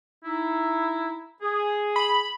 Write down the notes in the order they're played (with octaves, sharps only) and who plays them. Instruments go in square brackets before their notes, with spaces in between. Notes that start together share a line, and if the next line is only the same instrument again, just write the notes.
[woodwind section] D#4 E4
G#4
[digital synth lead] B5